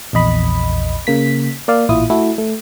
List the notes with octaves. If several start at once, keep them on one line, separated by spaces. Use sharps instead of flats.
A#1 E2 D#5 B5
C#3 A#3 B6
A#3 D5 F5
A1 A#2 E4 F4 D#6
A3 E4 F#4 A4
A3